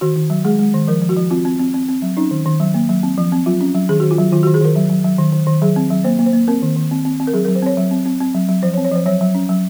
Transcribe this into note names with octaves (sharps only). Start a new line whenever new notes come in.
D#3 F#4
D#3
F#3
G#3 G#4
G#3
D#3
F3 A#4
F3
F#4
F3
C4 F4
C4
C4
C4
C4
F#3
C#4 D#4
D#3
D#3
F#3
A#3
F#3
C4
F3
C4
F#3 F4
C#4
F#3
D#3 G#4
F#4
D#3
F4
F#3
D#3 F4
F#4
D#3
G#4
D#3 A#4
F#3
F#3
F#3
D#3
D#3
D#3
F#3 G#4
C4
F#3
A#3 C5
A#3
C5
A#3
C4 A#4
D#3
D#3
C4
C4
C4
A#4
F#3 G#4
A#4
F#3
C5
C4 C#5
F#3
C4
C4
C4
F#3
F#3
F3 C5
C#5
C4
C#5
F3 C5
F#3 C#5
F#3
C#4
F#3